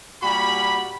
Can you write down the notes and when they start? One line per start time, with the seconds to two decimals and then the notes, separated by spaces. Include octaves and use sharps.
0.23 A#2 G3 F#4 B5